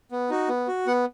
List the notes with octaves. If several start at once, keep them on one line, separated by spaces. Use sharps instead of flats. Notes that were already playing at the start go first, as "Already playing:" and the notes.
B3
D#4 F#4
B3
F#4
B3 F#5